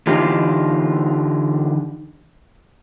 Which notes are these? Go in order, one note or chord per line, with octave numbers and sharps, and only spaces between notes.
D3 E3 D#4 F4 G4